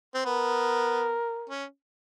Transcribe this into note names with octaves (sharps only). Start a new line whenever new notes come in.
C4
B3 A#4
C#4